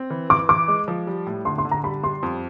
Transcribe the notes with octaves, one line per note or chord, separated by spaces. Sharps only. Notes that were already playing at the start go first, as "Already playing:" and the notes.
Already playing: C4
E3
E3 D6
E3 D6
G#3
F3
G3
A2
D3 C6
C6
D3
A#5
G3 B5
G3 C6
F2